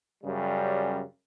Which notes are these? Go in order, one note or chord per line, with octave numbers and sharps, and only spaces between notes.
F#2 C#3 G3